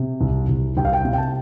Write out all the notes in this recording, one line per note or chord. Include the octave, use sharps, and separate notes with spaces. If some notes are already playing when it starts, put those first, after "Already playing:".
Already playing: C3
C2
C2
C2 G5
F5
G5
C3
G5
A5